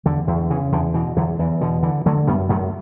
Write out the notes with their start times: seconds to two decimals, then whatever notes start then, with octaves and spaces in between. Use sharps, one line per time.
0.05 E2 D3
0.27 E2
0.50 C#3 E3
0.72 E2 D3
0.94 B2 E3
1.16 E2 D3 F#3
1.39 E2 E3
1.61 B2 D3
1.83 D3 E3
2.06 D3 F#3 A3
2.27 F#2 G3 B3
2.49 F#2 F#3 A3